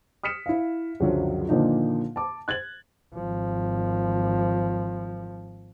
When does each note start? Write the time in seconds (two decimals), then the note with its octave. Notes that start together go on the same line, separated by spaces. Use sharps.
0.23 D#6 F6 B6 C#7 E7
0.46 E4 F5
1.00 C#2 F#2 D3 F3 F#3
1.49 A#2 D3 D#3 F3 D4 D#4
2.16 A5 D6
2.48 F#6 G#6 A6 F#7
3.14 G#1 F3